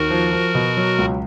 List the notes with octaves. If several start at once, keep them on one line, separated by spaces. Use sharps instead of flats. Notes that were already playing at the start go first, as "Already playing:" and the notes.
Already playing: D#2 F#4 A#4
F3
F3
B2
F#3
C#2